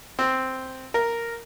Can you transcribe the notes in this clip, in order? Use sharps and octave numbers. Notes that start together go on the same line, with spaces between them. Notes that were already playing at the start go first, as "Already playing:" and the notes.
C4
A#4